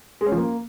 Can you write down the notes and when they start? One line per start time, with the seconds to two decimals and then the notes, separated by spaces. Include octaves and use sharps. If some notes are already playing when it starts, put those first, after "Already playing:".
0.21 G#3
0.26 C#4
0.32 F3
0.37 A#3